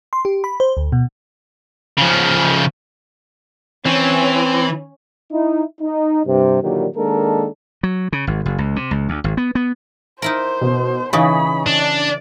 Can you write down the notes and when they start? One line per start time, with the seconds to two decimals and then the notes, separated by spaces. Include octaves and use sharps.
0.13 C6
0.25 G4
0.44 B5
0.60 C5
0.77 D2
0.92 B2
1.98 C#3 F3
3.86 E3 C4 C#4
5.32 D#4 E4
5.81 D#4
6.27 G2 C3
6.62 A#2 D3 D#3 F#3 G3
6.96 D#3 G#3 A#3 D4 A4 A#4
7.83 F#3
8.12 C#3
8.27 G#1
8.46 F#1
8.58 C#2
8.76 C3
8.91 C#2
9.09 D2
9.24 G#1
9.37 B3
9.55 B3
10.22 D#4 E4 A#4 C5
10.61 B2
11.13 C#3 E3 D#4 B5 C#6 D#6
11.67 D4 D5